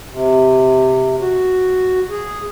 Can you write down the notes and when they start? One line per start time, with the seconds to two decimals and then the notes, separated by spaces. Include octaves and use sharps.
0.11 C3
1.21 F#4
2.10 G#4